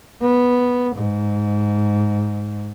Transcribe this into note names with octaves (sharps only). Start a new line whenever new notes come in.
B3
G#2